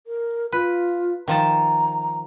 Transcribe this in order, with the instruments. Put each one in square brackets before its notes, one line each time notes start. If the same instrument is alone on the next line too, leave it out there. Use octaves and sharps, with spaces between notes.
[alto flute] A#4
[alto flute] F4 [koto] B4
[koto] D#3 F3 A5 [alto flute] A#5